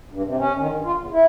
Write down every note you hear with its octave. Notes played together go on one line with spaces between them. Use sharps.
G2
C3
C#4
D#3
G2
F4
E2
E4